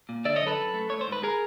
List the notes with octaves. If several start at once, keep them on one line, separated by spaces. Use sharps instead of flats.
A#2
D3 D5 E5
C#5 D#5
F#2
A4 B4
F#2
A3
A3 C#5
C5
G#2 B4
G#4 A#4